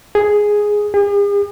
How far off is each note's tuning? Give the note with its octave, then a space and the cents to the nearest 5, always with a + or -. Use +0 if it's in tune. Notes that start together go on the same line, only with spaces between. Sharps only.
G#4 +0
G#4 -45